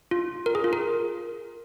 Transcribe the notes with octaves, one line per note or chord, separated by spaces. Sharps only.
F4
A#4
G#4
F4
A#4